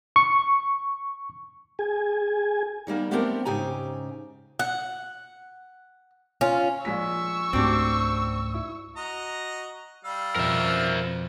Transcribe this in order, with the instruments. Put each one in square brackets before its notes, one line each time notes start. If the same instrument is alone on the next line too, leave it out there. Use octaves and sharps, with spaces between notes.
[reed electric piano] C#6
[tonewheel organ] G#4 G#5
[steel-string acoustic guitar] D#3 G3 A#3 B3
A3 B3 C4 D4 G4 A#4
G#2 C#3 G4 G#5 A#5
[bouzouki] F#5
C#4 F4
[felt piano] A#1 G#3 B6 [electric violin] C#6 E6
[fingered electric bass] C#2 G#2 A3 [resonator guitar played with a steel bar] C4 D4 [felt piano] F#4 G4
[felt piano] E4
[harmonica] F#4 D#5 A#5
G3 F5 E6
[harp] F2 B2 [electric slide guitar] A#4 E5